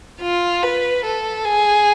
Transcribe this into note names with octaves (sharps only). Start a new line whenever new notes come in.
F4
B4
A4
G#4